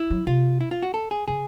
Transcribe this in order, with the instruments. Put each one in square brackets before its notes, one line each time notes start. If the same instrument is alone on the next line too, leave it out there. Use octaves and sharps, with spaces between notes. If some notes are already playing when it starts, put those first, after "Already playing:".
Already playing: [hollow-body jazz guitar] E4
[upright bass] F#3
[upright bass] C3 [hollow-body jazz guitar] F4
[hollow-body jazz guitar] E4
F4
F#4
A4
G#4
[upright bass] C#3 [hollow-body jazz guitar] G#4